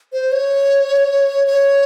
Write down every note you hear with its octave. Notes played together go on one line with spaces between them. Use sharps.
C5
C#5
C#5